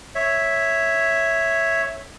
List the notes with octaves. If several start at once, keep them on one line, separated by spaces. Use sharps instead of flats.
C#5 E5